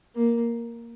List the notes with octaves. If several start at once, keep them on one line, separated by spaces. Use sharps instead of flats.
A#3